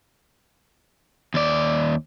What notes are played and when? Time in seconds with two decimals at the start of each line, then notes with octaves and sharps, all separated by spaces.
1.34 D#2 D5